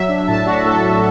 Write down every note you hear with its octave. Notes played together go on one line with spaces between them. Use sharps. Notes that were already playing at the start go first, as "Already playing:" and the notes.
Already playing: F#3 E5
D4
A2 A5
D4 F#4
A2 A4